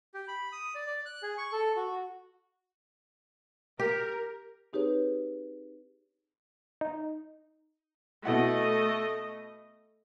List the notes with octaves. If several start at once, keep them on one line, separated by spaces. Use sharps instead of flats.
G4
B5
D#6
D5
D5
F#6
G#4
C#6
A4
F#4
G4 A#4
C4 D#4 G4 G#4 B4 C#5
D#4
B2 A3 E4 D#5 F#5